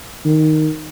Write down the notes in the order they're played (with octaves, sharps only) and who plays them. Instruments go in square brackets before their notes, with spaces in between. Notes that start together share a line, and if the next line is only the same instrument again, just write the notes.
[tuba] D#3